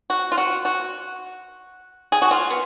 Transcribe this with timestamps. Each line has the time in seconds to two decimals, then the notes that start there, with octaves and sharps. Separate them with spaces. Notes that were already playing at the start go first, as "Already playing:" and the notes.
0.10 F#4
0.32 F4
0.38 F#4
0.65 F#4
2.12 G#4
2.22 F#4
2.31 F4
2.50 B3